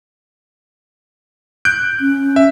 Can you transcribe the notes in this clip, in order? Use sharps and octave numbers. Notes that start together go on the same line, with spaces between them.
F#6 G6 D7
C#4
E5